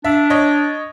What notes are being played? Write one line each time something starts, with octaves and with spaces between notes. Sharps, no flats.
D4 E5
C#5 D#5